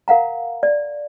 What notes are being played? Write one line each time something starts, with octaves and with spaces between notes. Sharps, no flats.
A#4 F5 F#5 A#5
D5